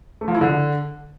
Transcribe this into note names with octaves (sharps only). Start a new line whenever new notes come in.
A3
F3
E4
D3